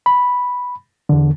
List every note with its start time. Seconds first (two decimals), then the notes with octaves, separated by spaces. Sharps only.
0.06 B5
1.09 E2 D3